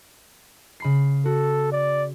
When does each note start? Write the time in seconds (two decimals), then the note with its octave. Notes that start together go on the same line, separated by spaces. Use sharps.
0.80 C#3 B5 C7
1.25 F#4 A4
1.72 D5